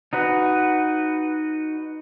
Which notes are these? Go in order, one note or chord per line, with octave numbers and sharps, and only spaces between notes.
D#4 F#4 B4